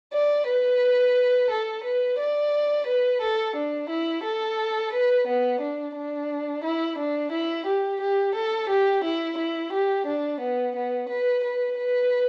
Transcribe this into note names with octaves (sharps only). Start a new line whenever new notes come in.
D5
B4
A4
B4
D5
B4
A4
D4
E4
A4
B4
B3
D4
D4
E4
D4
E4
G4
G4
A4
G4
E4
E4
G4
D4
B3
B3
B4
B4
B4